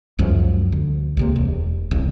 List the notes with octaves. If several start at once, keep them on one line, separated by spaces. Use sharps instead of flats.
C#2 F#2 F3 G3
D2
C#2 C3 A#3
E1
D#1 C2